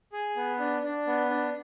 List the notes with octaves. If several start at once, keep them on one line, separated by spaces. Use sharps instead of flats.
G#4
B3
D4
D4
B3
D4